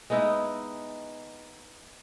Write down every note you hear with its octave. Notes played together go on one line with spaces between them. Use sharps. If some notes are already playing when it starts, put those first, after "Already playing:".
G#3 B3 D#4 E4